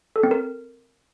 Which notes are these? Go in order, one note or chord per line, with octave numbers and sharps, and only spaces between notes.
A4
C4
A#4